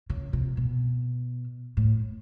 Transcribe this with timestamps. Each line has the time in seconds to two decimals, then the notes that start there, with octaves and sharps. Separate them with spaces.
0.10 C#3
0.33 C3
0.57 B2
1.77 A2